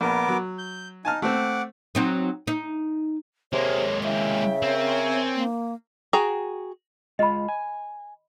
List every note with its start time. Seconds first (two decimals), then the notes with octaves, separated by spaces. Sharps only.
0.01 A#1 B3 A#4 D6
0.28 F#3
0.58 G6
1.05 D#4 G#5 A5 F6
1.22 A3 C4 F#5 D6
1.95 F#3 C4 D#4
2.47 D#4
3.53 C3 G#3 A#3 C#5
4.04 C#3 E4 E5 G5
4.62 C4 A#4 C#5 G#5
5.35 A#3
6.13 F#4 G#4 G5 A#5
7.19 G#3 F4 D#5 B5
7.48 G#5